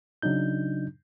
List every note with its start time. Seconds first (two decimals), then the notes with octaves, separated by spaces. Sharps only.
0.22 C#3 F#3 D4 D#4 G6